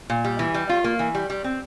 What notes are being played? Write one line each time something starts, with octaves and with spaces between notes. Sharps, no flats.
A#2
G3
E3
G3
F4
A#3
E3
G3
G3
C4